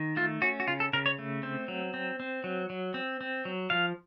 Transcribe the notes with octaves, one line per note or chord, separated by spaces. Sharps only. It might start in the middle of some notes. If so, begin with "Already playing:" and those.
Already playing: D#3
A3 F4
C#4 F#4
F#4
C#3 F4
A4
C#3 A#4
C#5
A3
C4
F#3
C4
C4
F#3
F#3
C4
C4
F#3
F3 F5